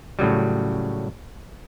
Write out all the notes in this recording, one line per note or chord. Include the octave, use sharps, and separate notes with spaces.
A2 C#3 F#3 G3